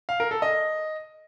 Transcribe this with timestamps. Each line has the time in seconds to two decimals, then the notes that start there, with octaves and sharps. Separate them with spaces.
0.09 F5
0.20 A#4
0.31 A4
0.42 D#5